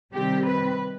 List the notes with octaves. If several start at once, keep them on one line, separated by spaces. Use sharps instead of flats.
C3 D#3 G3 C4 G4
B4